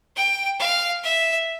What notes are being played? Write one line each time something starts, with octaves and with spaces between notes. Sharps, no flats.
G5
F5
E5